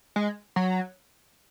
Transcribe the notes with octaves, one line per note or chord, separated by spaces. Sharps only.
G#3
F#3